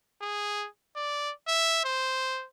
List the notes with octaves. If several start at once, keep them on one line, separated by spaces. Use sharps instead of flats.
G#4
D5
E5
C5